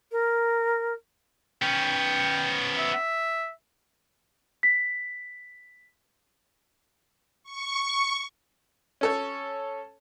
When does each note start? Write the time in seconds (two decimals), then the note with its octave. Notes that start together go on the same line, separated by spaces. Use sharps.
0.12 A#4
1.62 B3 C#4 G5
2.78 E5
4.63 B6
7.44 C#6
9.01 C#4 A4 C#5